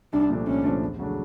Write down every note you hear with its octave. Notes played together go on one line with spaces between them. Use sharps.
C2 D4
A#2 F3 A3 D4
C2 C#4
A#2 F3 A3 D4
E2
C#3 F#3 A3 D4